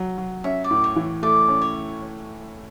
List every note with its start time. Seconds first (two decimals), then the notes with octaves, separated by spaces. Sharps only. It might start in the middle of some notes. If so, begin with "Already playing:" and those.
Already playing: F#3
0.18 F#3
0.44 C#4 E5
0.64 D5
0.71 A2
0.84 C#5
0.96 E3
1.23 A3 D5
1.49 C#4
1.62 C#5